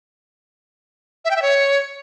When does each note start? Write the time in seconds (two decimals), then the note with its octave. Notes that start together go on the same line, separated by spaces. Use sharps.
1.25 E5
1.31 G5
1.36 E5
1.42 C#5